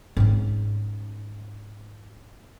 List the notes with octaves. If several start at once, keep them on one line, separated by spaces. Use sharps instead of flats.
G#2 C#4